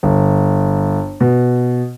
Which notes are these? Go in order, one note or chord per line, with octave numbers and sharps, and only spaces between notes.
G1
B2